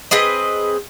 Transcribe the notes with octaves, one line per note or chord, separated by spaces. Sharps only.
C4 G#4 B4 D#5